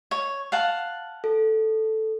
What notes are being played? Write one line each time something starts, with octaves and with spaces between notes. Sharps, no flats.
C#5
F5 F#5 A5
A4